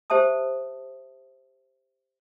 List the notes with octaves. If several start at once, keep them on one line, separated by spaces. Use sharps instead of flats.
G4 C5 E5 A5 D#6